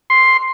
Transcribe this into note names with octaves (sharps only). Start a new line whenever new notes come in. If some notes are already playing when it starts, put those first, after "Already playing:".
C6